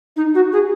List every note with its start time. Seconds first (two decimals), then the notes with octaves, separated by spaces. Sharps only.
0.16 D#4
0.35 F#4
0.53 G#4